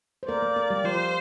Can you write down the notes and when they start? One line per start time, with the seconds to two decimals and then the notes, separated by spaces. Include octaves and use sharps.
0.23 C5
0.28 A#3 A#4 D5
0.42 A#3 A#4
0.56 A#3 A#4
0.70 G3 G4
0.84 F3 F4 C5